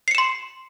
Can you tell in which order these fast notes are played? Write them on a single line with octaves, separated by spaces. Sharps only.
C7 C#7 E7 C6